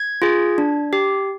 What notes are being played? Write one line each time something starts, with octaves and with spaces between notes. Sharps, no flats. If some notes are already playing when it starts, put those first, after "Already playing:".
Already playing: G#6
F4 G#4
D4
G4